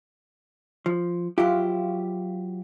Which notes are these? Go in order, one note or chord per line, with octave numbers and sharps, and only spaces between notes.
F3
F#3 E4 F4 G4